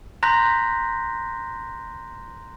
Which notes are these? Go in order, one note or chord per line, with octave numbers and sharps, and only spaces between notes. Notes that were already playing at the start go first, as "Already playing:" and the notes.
A#5 C6 F#6 G6 A#6 B6